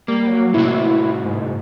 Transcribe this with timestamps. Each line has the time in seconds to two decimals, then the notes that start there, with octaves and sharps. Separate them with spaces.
0.08 G3 A#3
0.27 F#3
0.54 A2 C3 E4 F#4
1.25 G#2